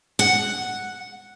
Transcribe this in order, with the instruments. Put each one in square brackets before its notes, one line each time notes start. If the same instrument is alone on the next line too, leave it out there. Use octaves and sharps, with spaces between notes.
[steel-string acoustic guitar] F#5